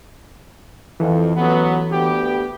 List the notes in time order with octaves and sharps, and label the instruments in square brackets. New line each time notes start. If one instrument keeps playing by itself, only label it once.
[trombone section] F2 [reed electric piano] E3 A4
[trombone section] A1 F#3 B3
D2 B3 G4